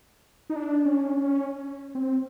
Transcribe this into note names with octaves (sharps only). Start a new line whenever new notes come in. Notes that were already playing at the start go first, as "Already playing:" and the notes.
D#4
D4
C#4
C#4
C4